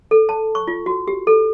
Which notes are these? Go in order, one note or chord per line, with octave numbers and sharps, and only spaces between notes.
A4
A5
C#6
F4
F#4
G4
A4